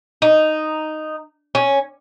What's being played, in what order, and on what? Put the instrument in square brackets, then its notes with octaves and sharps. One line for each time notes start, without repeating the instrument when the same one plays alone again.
[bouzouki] D#4
C#4